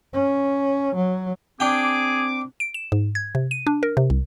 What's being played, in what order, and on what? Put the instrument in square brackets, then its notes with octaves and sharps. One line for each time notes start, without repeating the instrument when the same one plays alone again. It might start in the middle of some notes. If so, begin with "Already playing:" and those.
[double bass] C#4
F#3
[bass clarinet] C4 [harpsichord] D4 G5 [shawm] G#4 [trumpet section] D6
[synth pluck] D7
E7
G#2
G#6
C3
D#7
D4
A#4
C3
C2